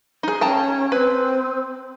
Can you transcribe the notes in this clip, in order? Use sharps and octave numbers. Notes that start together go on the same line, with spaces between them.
D#4 G#4
C#4 G5 A5 A#5
C4 B4